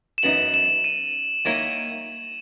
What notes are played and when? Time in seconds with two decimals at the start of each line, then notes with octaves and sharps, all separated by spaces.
0.18 E7
0.23 F#2 E3 B3 D#4 F#7
0.54 E7
0.84 D#7
1.45 D#3 A#3 E4 A#4 C#5